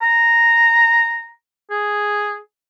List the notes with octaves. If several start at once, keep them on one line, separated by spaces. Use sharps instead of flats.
A#5
G#4